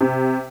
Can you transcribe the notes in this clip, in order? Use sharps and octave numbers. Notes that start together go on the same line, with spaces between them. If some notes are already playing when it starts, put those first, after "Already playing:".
C3